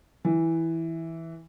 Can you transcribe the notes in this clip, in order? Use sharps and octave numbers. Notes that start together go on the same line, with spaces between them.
E3